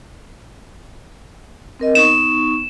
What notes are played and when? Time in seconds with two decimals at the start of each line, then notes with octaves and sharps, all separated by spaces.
1.80 C4 A#4 D#5
1.95 B3 D#4 C#6 E7